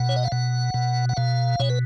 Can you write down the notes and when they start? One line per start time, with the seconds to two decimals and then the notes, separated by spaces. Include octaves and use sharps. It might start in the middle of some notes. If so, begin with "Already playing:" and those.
Already playing: B2 F#5
0.09 C#5
0.16 D#5
0.24 F5
0.32 B2 F#5
0.74 B2
1.09 F#5
1.17 B2 F5
1.60 B2 C#5
1.70 B4